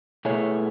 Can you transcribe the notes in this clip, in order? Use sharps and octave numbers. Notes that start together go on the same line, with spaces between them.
B2 A3 E4 G#4 C#5